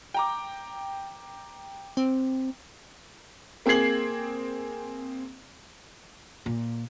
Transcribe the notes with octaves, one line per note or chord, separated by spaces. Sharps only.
G5 A#5 D6
C4
A#3 C4 G#4 G#6 C7 F#7
A#2